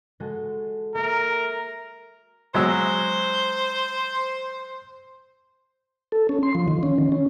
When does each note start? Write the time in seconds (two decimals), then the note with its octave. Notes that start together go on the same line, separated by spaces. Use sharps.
0.20 G#3 F#4 A4
0.95 A#3 A#4 E5
2.55 F#3 G#3 C5 E6
6.12 A4
6.29 C#4
6.43 C6
6.55 F3
6.68 D#3
6.83 C#4
6.98 D#3
7.12 C#4